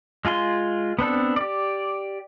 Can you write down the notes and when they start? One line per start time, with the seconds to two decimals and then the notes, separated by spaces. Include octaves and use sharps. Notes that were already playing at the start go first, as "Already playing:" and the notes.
0.25 G#3 F4 G#5 C6
0.99 B3 C4 D4 A4
1.36 G4 D5